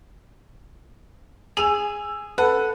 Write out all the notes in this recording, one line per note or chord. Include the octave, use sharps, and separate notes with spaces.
G#4 G#5 E6 F7
A4 B4 F#5